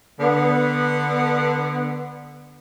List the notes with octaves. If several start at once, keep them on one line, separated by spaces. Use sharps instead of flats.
D3 B3